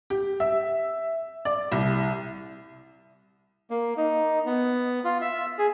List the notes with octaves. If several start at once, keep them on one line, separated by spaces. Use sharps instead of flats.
G4
E5
D5
C2
A#3
D#4
B3
F4
E5
G#4